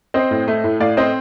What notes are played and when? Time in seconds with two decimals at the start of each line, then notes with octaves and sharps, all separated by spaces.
0.14 C4 C5 D#5
0.31 A2
0.48 A3
0.64 A2
0.80 A2 D5 F5
0.97 C4 C5 D#5